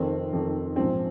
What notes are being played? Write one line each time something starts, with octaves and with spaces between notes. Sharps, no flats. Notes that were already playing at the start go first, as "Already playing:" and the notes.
Already playing: F1 F2 D#3 C4
F1 F2 D#3
A#1 G#2 F3 C4